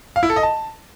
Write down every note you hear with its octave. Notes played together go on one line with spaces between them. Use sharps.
F5
E4
A4
D#5
A5